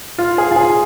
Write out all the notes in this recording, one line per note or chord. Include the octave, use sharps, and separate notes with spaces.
F4
G#4
F4
G#4